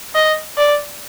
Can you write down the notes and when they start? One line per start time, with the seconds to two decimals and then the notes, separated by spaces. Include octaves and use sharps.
0.15 D#5
0.57 D5